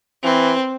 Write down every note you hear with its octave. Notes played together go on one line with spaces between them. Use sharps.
E3 C4